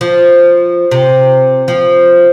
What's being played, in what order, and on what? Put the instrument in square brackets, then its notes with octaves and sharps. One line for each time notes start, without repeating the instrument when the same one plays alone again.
[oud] F3
C3
F3